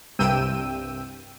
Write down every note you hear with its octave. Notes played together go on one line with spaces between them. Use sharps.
C2 G2 C3 G5 E6 D#7